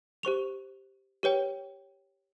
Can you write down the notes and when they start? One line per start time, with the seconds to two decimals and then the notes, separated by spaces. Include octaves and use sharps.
0.23 G4 C5 C#6 F7
1.23 G4 B4 C#5 G5